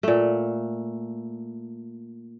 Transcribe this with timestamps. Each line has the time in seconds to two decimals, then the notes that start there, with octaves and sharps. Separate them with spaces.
0.03 A#2 A3